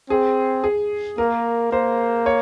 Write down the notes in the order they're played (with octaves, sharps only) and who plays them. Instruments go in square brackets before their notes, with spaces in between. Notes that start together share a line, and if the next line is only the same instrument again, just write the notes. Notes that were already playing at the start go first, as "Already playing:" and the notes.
[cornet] C4 [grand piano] G#4
[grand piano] G#4
[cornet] A#3 [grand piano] A#4
[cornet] A#3 [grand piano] C5
[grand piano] C#5